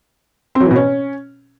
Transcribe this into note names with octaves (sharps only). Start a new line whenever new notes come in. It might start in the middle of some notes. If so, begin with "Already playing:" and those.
C4
F#3
E3
B2
C#4